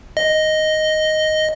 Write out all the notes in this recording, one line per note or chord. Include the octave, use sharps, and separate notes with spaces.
D#5